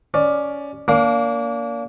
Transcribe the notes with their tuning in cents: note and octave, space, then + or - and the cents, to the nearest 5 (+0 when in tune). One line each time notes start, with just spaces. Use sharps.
C#4 +20 D5 +10
A#3 +0 D4 -35